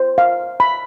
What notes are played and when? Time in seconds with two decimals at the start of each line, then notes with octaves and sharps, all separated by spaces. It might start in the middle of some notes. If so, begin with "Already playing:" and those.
Already playing: C5
0.18 F5
0.60 B5